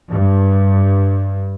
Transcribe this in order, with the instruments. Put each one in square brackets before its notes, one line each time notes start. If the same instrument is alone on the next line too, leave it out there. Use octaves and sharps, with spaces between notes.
[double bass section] G2